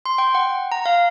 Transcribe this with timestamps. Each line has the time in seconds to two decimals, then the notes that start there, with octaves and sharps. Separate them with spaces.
0.06 C6
0.18 G5
0.35 F#5
0.72 A#5
0.86 F5